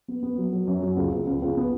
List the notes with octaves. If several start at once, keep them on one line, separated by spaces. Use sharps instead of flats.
B3
B3
F#3
F#3
F#2
F#3
C#2
C#2
C#2
C#2
B3